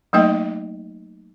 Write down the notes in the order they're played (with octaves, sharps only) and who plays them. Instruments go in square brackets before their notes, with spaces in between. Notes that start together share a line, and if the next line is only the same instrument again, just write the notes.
[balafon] F#3 A3 A#3 D#4 D#5 G5